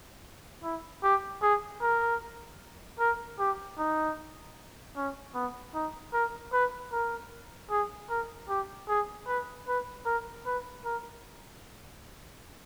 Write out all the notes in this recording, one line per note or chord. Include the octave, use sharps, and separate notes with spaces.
E4
G4
G#4
A#4
A#4
G4
D#4
C#4
B3
D#4
A#4
B4
A#4
G#4
A#4
G4
G#4
B4
B4
A#4
B4
A#4